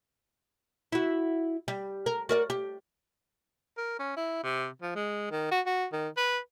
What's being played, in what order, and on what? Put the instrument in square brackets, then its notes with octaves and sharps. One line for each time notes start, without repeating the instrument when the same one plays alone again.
[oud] E4 F#4
G3
A#4
F#4 A#4 D5
G4
[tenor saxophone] A#4
C#4
E4
C3
F3
G#3
D#3
F#4
F#4
D#3
B4